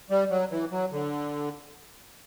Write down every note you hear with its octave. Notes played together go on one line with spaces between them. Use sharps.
G3
F#3
E3
F#3
D3